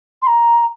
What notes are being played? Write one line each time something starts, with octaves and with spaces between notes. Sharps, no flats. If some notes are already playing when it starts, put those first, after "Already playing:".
C6
A#5